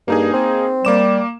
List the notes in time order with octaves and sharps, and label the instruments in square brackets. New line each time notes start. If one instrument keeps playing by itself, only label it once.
[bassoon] G2 [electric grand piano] A#3 D#4 G#4
[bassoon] C4
[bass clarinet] G3 [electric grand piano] A#3 D6 E7